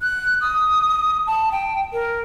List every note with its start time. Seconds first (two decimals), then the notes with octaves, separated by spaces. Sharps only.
0.01 F#6
0.41 D#6
1.27 A5
1.52 G5
1.93 A#4